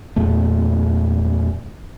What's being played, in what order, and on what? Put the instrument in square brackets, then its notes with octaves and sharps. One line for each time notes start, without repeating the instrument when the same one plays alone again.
[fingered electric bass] E2 A#2 A3